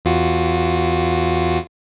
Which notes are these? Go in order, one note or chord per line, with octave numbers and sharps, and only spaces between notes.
E2 F4 F#4